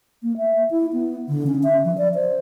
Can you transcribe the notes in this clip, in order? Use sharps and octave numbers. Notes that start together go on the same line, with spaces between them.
A#3
E5
E4
B3
D3
C#4
E5
F3
D5
C5